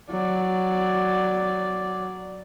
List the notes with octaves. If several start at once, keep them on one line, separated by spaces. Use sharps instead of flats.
F#3 D5